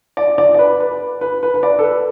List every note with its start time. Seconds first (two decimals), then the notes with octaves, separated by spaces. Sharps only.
0.17 D5
0.38 D5
0.54 D5
0.59 B4
0.80 B4
1.21 B4
1.43 B4
1.54 B4
1.63 D5
1.79 A4
1.84 B4